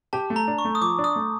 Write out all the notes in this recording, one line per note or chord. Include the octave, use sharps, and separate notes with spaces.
G4 A5
A3
A#5
D4
C#6
A3
D#6
F3 D6
D4
D#6
A3